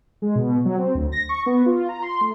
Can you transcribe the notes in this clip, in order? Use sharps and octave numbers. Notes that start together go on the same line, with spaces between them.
G#3
B2
F#3
C4
D2
A#6
C#6
B3
F4
A#5
C6
A3